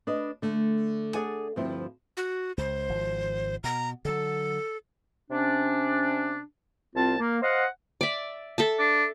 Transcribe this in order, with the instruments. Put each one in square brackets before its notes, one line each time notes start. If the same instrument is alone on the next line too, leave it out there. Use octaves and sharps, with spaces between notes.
[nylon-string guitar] D4 B4 D#5
D3 A3
G#4 A4 D5 F#5 G#5
D2 G2 F3 C4 E4 C5
[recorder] F#4
[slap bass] C#2 [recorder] C5
[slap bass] G#1 F3
[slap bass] B2 [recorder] A#5
[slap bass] D3 F#3 [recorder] A4
[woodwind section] C3 C#4 D4
C2 C4 F4 A5
A#3
C5 D#5 F5 F#5
[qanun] D5 E5
A4 E5 A5
[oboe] D4